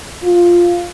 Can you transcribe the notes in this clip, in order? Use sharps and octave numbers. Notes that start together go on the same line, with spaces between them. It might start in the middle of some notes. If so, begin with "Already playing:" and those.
F4